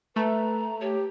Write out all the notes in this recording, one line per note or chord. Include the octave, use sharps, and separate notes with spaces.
A3 B4 A#5
G4 C#5